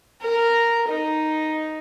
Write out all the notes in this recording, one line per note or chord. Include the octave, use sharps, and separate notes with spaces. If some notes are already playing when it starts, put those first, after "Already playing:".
A#4
D#4